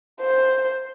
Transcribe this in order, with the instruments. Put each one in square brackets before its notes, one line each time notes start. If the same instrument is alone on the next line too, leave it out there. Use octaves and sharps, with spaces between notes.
[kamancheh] C5